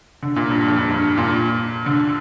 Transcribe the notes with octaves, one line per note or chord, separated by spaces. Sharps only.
D3
A#2
G2
F2
G2
G2
A#2
D3